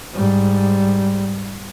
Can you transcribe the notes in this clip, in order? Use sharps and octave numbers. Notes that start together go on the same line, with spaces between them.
G#2 G3